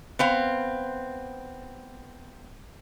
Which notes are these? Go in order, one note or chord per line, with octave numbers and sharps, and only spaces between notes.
B3 C4 F5